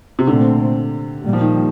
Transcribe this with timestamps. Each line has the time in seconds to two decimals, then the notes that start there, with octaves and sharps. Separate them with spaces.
0.19 C3
0.27 A#2 D3 A3 C4
1.24 A#2 G3 A#3
1.33 F3
1.41 D#3